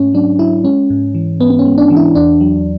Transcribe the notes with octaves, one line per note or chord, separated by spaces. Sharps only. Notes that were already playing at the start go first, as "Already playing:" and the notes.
Already playing: G#2 A3 C#4
F#3 D4
F#3 E4
G#3 C#4
G#2
E3
G#2 B3
B3
C#4
G#3
D4
E3
E4
E2 D4
F#3